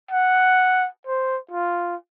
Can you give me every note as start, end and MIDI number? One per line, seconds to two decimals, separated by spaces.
0.11 0.87 78
1.07 1.38 72
1.51 1.95 65